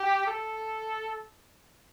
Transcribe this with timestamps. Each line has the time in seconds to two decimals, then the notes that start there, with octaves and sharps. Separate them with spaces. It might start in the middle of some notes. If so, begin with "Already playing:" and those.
Already playing: G4
0.27 A4